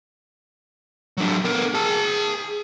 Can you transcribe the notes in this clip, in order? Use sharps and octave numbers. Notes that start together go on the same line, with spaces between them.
F#3 D4
B3 A#4
G#4 A5